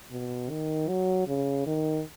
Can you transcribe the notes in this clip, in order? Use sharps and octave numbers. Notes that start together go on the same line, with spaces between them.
B2
D#3
F#3
C#3
D#3